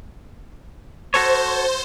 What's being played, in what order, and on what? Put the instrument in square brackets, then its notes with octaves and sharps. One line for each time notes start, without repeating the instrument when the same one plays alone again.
[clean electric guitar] F#4 A4 C#5 [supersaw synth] C5